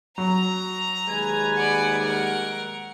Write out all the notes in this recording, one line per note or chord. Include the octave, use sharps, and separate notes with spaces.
F#3 A#5
D#2 G3 G#3 B4 G#5
D5 F#5
A#4 F#5